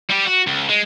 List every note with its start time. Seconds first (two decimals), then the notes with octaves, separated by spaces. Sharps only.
0.10 G3 G4
0.26 F#4
0.47 C#2
0.69 G#3